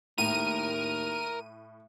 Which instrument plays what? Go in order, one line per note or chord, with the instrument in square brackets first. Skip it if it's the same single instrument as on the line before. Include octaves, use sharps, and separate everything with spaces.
[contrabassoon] D#2 [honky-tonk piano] A2 [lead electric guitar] A#4 A#5 [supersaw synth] D#7